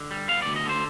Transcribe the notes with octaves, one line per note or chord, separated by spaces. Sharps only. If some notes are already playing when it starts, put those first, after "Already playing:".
Already playing: D3
G3
B3 F5
D2 D5
D#5
D3 C5